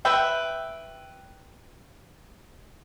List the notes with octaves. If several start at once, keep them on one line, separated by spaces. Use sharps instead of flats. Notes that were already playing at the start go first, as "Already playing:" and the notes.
B4 E5 G5